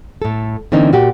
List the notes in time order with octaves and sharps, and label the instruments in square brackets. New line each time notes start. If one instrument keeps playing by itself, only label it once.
[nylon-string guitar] A2 A4
D3 E3 A#3 C4 C#4 D#4
A#2 F#4 G4